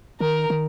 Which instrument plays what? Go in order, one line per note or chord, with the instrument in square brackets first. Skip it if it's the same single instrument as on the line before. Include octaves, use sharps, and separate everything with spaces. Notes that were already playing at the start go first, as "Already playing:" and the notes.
[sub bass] D#3 [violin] A#4
[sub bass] D#3